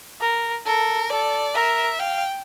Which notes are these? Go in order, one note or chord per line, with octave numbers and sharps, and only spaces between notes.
A#4
A4 A#4
A4 D5
A#4 E5
F5 G5